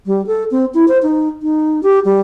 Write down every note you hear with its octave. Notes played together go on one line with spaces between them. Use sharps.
G3
A4
C4
E4
C5
D#4
D#4
G4
G3